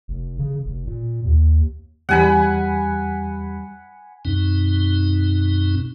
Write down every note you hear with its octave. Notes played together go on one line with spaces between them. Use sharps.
F1
C#3
F1
A#2
D#2
E2 G3 F#5 G#5 B5
F#2 B2 C4 D#4